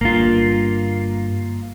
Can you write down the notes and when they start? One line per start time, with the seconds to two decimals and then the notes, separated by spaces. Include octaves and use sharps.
0.01 G1 G2 A#3 F4